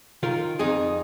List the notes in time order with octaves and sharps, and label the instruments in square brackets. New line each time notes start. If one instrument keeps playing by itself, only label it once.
[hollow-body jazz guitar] D#3 F4 A#4
F2 D#4 G#4